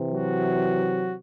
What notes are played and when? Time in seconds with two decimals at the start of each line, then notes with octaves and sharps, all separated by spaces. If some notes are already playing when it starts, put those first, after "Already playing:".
Already playing: C3 E3
0.12 F#3 F#4